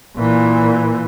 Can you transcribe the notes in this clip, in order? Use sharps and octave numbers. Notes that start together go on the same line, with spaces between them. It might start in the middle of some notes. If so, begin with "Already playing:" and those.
A#2 E3